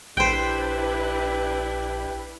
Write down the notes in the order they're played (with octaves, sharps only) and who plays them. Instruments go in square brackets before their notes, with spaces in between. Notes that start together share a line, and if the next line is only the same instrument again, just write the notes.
[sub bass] A#1 [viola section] D4 E4 B4 [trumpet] G4 [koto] C5 G5